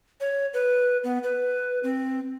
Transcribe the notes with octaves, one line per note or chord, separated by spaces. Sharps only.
C#5
B4
B3
B4
C4